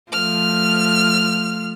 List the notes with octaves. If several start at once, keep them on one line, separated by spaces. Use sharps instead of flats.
F3 A3 F6